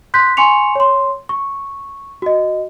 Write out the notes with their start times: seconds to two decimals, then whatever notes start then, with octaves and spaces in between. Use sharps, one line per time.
0.14 C6 F#6 G6 B6
0.37 G#5 C6 C#6 C#7 F7
0.75 C#5 C6
1.29 C#6
2.22 F#4 D#5